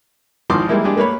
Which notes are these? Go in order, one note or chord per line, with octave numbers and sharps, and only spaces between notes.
G#1 E3 F3 C6 D6 D#6
E3 G3 G#3 A#3 E4
G#3 D4 G4 G#4
A3 A#3 B4 C#5 B5